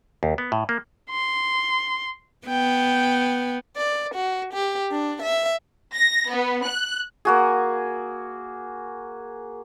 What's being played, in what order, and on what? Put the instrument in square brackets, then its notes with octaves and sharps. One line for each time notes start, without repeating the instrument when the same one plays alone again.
[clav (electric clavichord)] D#2
B3
A2
A#3
[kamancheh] C6
[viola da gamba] B3 [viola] G5
[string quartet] D5
F#4
G4
D4
E5
[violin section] A#6
B3
F#6
[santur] A#3 F#4 G#4